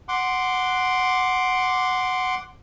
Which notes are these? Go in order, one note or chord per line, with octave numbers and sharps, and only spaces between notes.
F#5 C6 D6